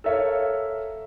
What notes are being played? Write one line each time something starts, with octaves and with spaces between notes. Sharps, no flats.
A4 A#4 C#5 E5 F5